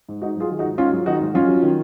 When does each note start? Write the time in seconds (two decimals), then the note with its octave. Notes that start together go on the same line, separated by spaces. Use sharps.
0.09 G#2
0.22 G#2 D#4 F#4
0.36 F#3 F4 G#4
0.51 D#3
0.59 D#4 F#4
0.64 G#2
0.78 G#2 C#4 F4
0.92 F#3
1.06 D#3 D#4 F#4
1.21 G#2
1.34 F#2 C#4 F4
1.48 F#3
1.63 D#3